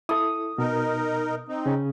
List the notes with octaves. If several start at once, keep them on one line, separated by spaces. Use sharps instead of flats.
E4 A4 D#6
B2 D#4 A#4
C4 D#4
C#3 C#4